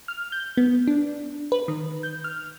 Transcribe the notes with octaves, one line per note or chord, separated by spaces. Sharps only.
F6
G6
B3
D4
B4
D#3
G6
F6